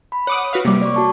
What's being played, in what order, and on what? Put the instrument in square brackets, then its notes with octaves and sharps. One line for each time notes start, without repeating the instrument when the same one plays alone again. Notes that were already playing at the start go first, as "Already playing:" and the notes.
[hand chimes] B5
[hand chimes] C#5 [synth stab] F#5 D6 D#6
[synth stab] F#4 B4 F5
[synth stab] C3 G3 [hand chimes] A#3 D6
[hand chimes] D5 C#6
F#4 A5 C#6